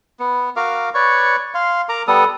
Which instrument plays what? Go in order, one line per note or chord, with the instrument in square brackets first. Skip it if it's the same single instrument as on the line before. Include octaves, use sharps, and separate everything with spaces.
[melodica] B3
F#4 A#4 F5 D6
B4 C#5 D5 C#6
F5 C6
A#4 A#5 D6
G3 B3 A4 D#6